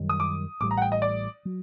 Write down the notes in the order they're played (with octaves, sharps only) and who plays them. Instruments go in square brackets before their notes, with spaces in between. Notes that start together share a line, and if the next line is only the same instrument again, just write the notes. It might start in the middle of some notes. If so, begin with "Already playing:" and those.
Already playing: [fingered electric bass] F#2 D#3 G3
[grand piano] D#6
D6
[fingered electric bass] A1 A2 G3 [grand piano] D6
[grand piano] A#5
F#5
G5
D#5
D5
[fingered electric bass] F#3